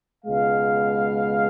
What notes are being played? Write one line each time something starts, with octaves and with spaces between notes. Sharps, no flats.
C#2 B2 G#3 F5